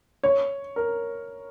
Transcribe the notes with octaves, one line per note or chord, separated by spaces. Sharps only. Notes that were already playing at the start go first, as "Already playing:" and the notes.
C#5
A#4